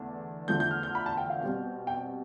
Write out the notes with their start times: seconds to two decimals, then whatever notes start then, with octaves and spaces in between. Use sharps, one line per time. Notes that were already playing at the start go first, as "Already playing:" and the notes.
Already playing: E2 D3 A3 D4
0.48 E2 D3 F3 A3 G6
0.60 G6
0.71 F6
0.83 G6
0.95 B5
1.06 A5
1.17 G5
1.30 F5
1.41 B2 G3 C4
1.87 G5